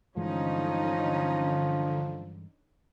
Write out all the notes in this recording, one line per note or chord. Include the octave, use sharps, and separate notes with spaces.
G2 D3 E3 F3 G#3 C#4 D#4